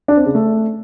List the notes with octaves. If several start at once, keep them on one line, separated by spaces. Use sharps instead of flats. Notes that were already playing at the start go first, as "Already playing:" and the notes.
D4
C4
C#3
A3